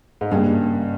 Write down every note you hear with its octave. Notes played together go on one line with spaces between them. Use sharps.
G#2
G2 C#3 G3 A#3 C#4 G4